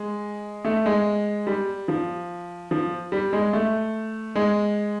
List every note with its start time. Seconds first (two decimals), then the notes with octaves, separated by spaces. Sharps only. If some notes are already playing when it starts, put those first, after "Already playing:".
Already playing: G#3
0.65 A3
0.86 G#3
1.47 G3
1.88 F3
2.71 F3
3.12 G3
3.33 G#3
3.53 A3
4.35 G#3